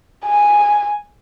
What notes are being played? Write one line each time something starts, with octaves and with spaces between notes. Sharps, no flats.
G#5